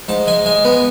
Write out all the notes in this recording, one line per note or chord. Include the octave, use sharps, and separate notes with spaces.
G#2 A5
G#3 G#5
G#3 G#5
B3